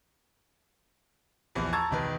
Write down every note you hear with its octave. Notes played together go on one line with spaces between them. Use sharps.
A#1 E2 E3
A5 A#5 C#6 E6 G#6 A6
E1 D#3 B4